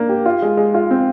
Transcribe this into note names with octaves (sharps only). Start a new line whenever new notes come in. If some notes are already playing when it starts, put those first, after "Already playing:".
Already playing: A#3 D4
G4
F4
G#3
G#3
F4
C4